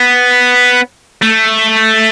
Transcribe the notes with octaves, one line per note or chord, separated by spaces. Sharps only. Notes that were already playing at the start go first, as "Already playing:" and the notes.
Already playing: B3
A3